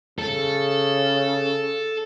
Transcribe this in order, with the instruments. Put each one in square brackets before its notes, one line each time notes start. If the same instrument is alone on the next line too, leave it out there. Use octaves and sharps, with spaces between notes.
[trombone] C#3 [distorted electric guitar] A4